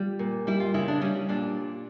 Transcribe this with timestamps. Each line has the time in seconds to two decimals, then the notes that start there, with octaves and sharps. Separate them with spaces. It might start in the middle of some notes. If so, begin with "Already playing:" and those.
Already playing: G3 F4
0.19 A#2
0.47 G3 E4
0.60 F4
0.74 C#3 E4
0.88 D4
1.02 G3 C#4
1.29 A#2 D4